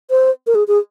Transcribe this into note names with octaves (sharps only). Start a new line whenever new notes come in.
C5
A#4
G#4
G#4